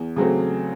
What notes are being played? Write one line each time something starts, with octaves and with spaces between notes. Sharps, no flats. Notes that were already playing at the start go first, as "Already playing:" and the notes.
Already playing: E2
C#3 F#3 A3 C4